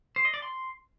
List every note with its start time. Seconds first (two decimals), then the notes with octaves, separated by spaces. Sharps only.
0.16 C5
0.25 D#5
0.34 D5
0.42 C6